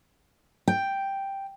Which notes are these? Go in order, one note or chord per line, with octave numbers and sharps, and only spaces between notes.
G5